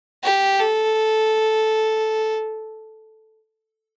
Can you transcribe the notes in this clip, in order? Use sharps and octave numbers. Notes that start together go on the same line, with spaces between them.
G4
A4